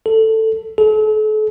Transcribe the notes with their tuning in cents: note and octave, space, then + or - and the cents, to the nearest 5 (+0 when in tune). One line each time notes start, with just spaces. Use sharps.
A4 +10
A4 -40